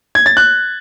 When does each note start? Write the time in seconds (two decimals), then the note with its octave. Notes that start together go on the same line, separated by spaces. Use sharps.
0.15 G#6
0.26 A6
0.37 F#6